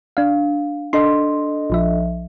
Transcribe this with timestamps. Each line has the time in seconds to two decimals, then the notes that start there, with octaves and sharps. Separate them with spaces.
0.17 D4 F5
0.93 D4 A4 D#5 C6
1.70 A#1 F3 E5